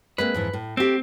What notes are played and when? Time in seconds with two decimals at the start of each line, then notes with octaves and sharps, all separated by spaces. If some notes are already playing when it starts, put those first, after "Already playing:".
0.18 G#3 A#3 C4 B4
0.34 F2 G#2 E3
0.53 A2
0.77 A3 C4 G4